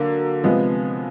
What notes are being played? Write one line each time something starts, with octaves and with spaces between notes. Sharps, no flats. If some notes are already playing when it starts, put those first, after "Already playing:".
Already playing: D3 F#3 A#3
C3 F3 G#3 B3